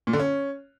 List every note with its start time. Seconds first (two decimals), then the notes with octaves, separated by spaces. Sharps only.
0.07 A#2
0.13 D3
0.20 C#4